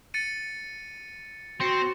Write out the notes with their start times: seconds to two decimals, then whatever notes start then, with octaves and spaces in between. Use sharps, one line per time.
0.14 A6 C#7 D#7
1.60 C4 F#4 C6 A#6 C#7